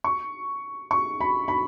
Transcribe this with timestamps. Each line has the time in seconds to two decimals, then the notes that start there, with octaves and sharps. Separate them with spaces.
0.04 C#6
0.91 C#6
1.20 B5
1.48 B5